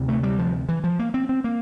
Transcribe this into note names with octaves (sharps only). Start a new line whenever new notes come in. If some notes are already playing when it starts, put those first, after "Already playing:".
Already playing: D2 C3
A3
G3
F3
E3
F3
A#3
C4
C4
A#3